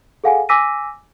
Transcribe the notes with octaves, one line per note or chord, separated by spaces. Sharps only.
G#4 A4 F5 F#5 G#5
G#5 D6 E6 A#6 B6 D#7